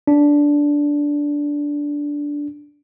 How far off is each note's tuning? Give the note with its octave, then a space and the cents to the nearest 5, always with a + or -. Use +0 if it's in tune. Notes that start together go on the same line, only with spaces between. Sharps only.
D4 -10